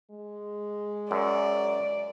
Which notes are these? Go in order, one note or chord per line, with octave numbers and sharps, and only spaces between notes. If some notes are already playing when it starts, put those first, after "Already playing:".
G#3
F#2 D5